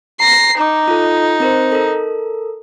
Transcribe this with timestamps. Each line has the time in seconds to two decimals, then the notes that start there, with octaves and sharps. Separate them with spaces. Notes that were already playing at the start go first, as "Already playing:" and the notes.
0.20 A#5 A#6 C7
0.58 D#4 A#5 D6
0.88 F4 A4
1.40 C4 A#4 C5
1.72 A4 A#4